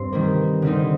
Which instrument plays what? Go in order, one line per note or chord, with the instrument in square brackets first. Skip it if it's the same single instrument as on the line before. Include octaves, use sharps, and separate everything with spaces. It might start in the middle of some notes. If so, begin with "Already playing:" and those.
Already playing: [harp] G2 C4 C6
D#3 G3 A#3
D3 G3 C4 D#4